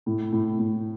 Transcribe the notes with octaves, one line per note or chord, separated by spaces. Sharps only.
A2
A2
A2